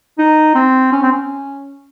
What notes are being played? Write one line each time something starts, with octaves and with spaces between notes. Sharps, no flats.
D#4
C4
C#4
C4
C#4